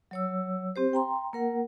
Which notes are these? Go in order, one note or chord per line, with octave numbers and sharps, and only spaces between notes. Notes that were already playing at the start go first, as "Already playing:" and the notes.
F#3 C#5 E6
C4 G4 C5
G5 A#5 C6
A#3 A#4 F#5